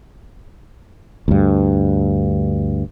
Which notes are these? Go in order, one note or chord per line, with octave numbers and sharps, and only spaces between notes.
D2 G2